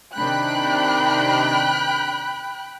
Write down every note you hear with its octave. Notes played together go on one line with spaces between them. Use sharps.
C3 D#3 D4 G5 B5 F#6